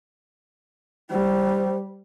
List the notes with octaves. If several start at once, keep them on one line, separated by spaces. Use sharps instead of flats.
G3 C5